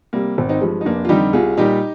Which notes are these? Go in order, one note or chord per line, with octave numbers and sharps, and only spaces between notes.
C3 G3 A#3
G#1 C4
C4 D#4
G2 F3 G#3
D#4
F1 A#3 D4
F4
F2 D3 G3 D#4 G4
C2 F4 G#4
A#2 G3 D#4 G4